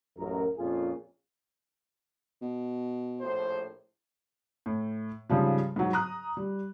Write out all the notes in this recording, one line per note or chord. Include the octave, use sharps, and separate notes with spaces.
A1 F#2 A#4
F2 A#2 C#4 F4 G#4
B2
A#1 A2 C5
A2
G#2 C#3 F3 G3
G#2 F#3
A#5 D#6 F#6
G3